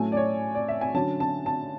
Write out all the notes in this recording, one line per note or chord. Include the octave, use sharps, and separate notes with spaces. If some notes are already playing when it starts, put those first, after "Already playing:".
Already playing: A2 F#3 A3 C#4 G#5
D5
C#5
D5
E5
G#5
D3 F#3 C#4 A5
A5
A5